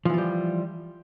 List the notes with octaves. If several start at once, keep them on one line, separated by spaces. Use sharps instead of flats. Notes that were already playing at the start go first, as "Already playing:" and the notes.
E3 F3 G3 F4